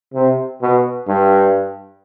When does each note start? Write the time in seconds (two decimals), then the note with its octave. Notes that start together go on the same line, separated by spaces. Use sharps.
0.14 C3
0.61 B2
1.08 G2